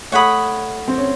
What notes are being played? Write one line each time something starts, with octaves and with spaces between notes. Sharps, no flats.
A3 C#5 F#5 B5 D#6
C4
C#4